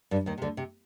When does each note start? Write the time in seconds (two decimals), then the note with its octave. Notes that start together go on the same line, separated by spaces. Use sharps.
0.11 G2 G3
0.26 D#2 D#3
0.38 C3
0.42 D2 D3
0.57 C3